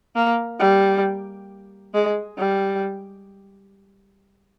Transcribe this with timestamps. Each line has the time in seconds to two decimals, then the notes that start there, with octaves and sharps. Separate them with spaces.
0.15 A#3
0.60 G3
1.94 G#3
2.39 G3